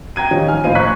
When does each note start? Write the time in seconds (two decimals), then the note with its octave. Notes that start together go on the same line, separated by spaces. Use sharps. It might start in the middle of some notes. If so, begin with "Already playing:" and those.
0.16 G5 A#5 G#6 D#7
0.31 D#3 F3 G3 C#4 D#4
0.48 G#5 F6
0.64 A2 F3 F4 C5 D#5 D#7
0.75 C5 A#5 C#6 F#6 G#6 B6